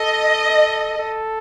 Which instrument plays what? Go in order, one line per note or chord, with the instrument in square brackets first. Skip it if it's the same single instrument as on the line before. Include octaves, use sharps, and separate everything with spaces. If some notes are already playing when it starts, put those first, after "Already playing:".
Already playing: [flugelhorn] A4 [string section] D#5
[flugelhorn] A4